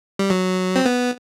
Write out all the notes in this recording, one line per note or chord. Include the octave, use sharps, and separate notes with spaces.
G3
F#3
C4
B3